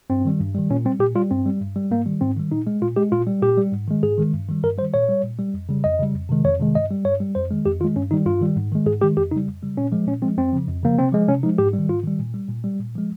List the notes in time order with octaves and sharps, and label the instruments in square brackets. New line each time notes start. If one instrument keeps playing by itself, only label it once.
[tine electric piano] G2 C4
D#3 G3
G2
D#3 G3
A#2 C#4
G3 C4
A#2 G4
G3 F4
G2 C4
G3
G2
G3
G#2 A#3
D#3 G3
G#2 C4
D#3 G3
A#2 D#4
G#3
A#2 F4
G#3 G4
A#2 F4
G3
A#2 G4
G3
G#2
D#3 G#3
G#2 G#4
D#3 G#3
G2
D#3 G3
G2 A#4
G3 C5
D#3
A#2 C#5
G3
A#2
G3
F2
C#3 G3
F2 D#5
C#3 G3
F2
C3 D#3 G#3
F2 C#5
C3 D#3 G#3
G2 D#5
G3
G2 C#5
G3
F2 C5
D#3 G#3
F2 G4
D#3 F4
G#3
G2 C#4
D#3 G3 D#4
G2 F4
D#3 G3
G#2
D#3 G#3
G#2 G#4
D#3 G#3 G4
F2 G4
C#3 G3 D#4
F2
C#3 G3
A#2 C#4
F3 G#3
A#2 C#4
F3 G#3 C4
F2 C4
C#3 F3
F2
C#3 F3 A#3
C3 C4
F3 G#3
C3 C#4
F3 D#4
G#3
G#2 G4
G3
D#3
G#2 F4
D#3 G3
A#2
G3
A#2
G3
A#2
F3 G#3